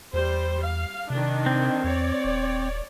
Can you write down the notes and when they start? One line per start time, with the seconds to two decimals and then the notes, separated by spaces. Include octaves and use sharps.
0.13 E2 G3 C5
0.64 F5
1.10 C3 D#3 D4
1.46 C4
1.84 E2 C#5 D5
2.24 D#1